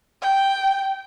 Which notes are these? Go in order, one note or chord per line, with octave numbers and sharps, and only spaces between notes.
G5